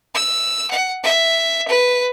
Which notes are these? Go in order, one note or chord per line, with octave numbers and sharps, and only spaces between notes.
E6
F#5
E5
B4